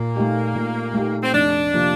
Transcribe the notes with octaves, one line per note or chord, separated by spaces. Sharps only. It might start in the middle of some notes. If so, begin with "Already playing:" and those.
Already playing: A#2 A#3
A3 D#4 G4
A#2
A3 D#4 G4
C4
F1 D4
C3 F3 A#3